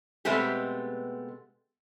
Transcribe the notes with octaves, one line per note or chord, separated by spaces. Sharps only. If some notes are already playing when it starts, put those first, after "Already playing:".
B2 G#3 A3 B3 C4 G4